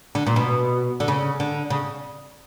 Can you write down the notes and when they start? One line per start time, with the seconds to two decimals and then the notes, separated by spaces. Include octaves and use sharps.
0.15 D3
0.27 A#2
0.36 B2
1.00 D3
1.08 C#3
1.40 D3
1.70 C#3